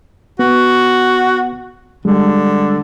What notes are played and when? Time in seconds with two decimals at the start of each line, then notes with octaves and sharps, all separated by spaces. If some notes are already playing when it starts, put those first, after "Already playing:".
0.39 B3 F#4
2.05 D3 G3 G#3